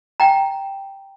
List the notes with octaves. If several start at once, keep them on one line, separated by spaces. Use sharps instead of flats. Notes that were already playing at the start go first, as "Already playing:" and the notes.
G5 A#5